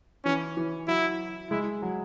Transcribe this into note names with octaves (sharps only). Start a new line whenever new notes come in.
E3 C#4
E3
F#3 E4
G#3 E4
F#3